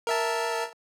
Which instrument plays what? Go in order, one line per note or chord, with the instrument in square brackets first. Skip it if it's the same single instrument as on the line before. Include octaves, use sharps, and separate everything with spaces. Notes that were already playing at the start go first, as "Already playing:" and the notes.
[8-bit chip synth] A#4 E5 A5